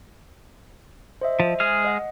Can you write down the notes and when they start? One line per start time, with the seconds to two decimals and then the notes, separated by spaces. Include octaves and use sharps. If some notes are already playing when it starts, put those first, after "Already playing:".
1.21 C5 D#5 E5
1.40 F3
1.60 G#3 G#4 F6
1.85 D#5 F#5